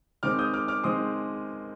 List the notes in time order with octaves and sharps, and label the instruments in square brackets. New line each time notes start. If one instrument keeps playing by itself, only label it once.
[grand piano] D#3 G#3 C4 D6 F6
D#6 G6
D6 F6
D6 F6
D#3 G#3 C4 C6 D#6